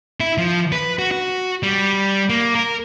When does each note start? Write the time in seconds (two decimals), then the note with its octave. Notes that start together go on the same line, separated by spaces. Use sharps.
0.20 E4
0.38 F3
0.72 B4
0.99 F#4
1.11 F#4
1.63 G3
2.30 A#3
2.55 A#4